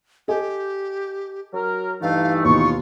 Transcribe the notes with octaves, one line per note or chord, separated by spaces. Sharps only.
G4 A4 D#5 G#5
F#3 A#4
G2 E3 A3 D#4 F5
D#2 B2 D#3 F4 C#6